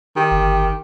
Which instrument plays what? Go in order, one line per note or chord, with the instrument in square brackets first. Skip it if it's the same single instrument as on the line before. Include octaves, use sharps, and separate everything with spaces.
[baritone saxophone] D#3 [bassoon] G4
[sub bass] G1